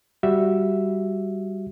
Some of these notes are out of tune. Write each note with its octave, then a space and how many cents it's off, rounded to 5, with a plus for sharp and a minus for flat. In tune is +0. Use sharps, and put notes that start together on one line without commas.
G3 +0 F#4 +0 E5 +0